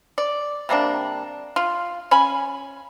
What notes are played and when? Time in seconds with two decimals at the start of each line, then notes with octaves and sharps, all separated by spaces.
0.18 D5
0.69 C3 G3 A#3 D4
1.56 F4
2.11 C#4 G#5 B5